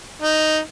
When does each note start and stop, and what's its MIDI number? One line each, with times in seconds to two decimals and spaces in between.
0.22 0.59 63